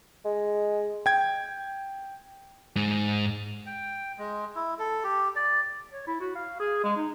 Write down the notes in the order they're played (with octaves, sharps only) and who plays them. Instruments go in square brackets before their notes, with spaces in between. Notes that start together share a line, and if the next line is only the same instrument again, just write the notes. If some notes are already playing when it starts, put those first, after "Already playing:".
[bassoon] G#3
[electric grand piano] G5 G#6
[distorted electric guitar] G#2
[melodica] G5
G#3
E4
A4
G4
D5
[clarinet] C#5
E4
F#4
F5
G#4
G#3
D#4